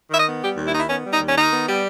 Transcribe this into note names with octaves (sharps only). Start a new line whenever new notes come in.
D#3 E5
D#5
B3
G3 G4
D#2
E4
D#3 D#4
E4
B3 C#4
G3
D#4
D#2
C#4
D#3 D#4
B3
G3